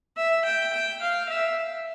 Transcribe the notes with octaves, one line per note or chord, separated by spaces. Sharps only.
E5
G5
G5
F5
E5